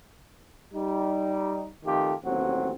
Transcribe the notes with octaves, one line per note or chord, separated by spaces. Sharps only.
G3 D#4
F2 D#3 A3 F4 G4
A1 D#2 F#3 C4